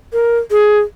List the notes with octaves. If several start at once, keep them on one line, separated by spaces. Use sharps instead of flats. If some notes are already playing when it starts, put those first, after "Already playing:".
A#4
G#4